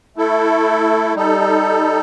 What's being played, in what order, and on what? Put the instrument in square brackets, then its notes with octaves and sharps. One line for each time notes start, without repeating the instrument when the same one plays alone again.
[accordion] A3 E4 A4
G3 D#4 A4